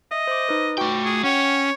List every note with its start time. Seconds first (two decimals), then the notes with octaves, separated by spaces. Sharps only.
0.11 D#5 E5
0.27 C5 D6
0.49 D#4 B4
0.78 A3 F#4 G5 C#6 D6
1.05 G#4
1.24 C#4 C#5 F#5 G5